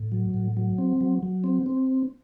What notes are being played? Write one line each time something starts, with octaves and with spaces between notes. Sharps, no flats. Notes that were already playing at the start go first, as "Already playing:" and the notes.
Already playing: A2
F#3
A2
F#3
C4
F#3
F#3
C4
C4